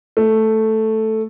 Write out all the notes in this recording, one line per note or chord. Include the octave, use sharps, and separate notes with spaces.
A3